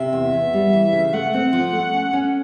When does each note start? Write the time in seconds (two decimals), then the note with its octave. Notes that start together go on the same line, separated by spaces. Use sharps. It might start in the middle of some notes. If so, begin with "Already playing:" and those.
Already playing: C3 E5
0.13 E2
0.34 E2
0.53 G3
0.73 E3
0.93 C#3
1.13 A3 F#5
1.34 C4
1.53 F3
1.73 A3
1.93 C#4
2.13 C#4